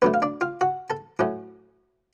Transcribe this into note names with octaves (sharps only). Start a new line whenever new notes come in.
D3 F#3 A3 B3 B4
F5
D4 D5
F4 F5
F#4 F#5
A4 A5
A2 F#3 A3 C#4